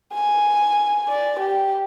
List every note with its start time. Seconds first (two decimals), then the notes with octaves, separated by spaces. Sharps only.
0.14 G#5
1.08 D5
1.39 G4